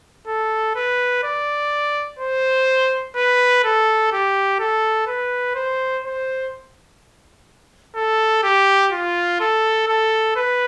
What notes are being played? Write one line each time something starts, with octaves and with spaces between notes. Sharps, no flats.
A4
B4
D5
C5
B4
A4
G4
A4
B4
C5
C5
A4
G4
F4
A4
A4
B4